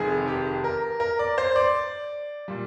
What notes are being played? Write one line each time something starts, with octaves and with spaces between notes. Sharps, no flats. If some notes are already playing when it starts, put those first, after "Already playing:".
Already playing: F1 F2 D#3 G#3 G#4
G4
A#4
A#4
D5
C5
D5
A#2 G3